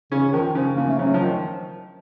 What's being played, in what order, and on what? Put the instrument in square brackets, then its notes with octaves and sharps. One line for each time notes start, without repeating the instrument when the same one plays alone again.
[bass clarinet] C#3 [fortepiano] C#4
[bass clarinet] D#3 [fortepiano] F3
[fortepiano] C#3 [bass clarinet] F3
[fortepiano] C#3 [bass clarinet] A#3
[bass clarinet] A3
[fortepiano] C#3 [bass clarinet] F#3
[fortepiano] F3
D#3